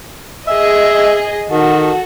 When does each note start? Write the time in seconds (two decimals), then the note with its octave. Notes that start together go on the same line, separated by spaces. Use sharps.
0.48 G#4 D#5 E5
1.50 D#3 F#4 A4